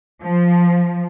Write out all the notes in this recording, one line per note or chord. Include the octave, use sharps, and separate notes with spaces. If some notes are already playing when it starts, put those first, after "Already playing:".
F3